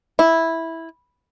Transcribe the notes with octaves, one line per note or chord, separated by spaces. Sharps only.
E4